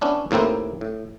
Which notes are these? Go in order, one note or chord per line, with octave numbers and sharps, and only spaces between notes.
B3 C#4 D4 E4
D#2 A2 A#3 C4 E4
A2